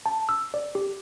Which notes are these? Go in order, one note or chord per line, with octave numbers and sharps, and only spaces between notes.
A5
E6
D5
G4